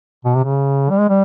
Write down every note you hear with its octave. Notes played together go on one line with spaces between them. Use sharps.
B2
C3
C#3
G3
G#3
G3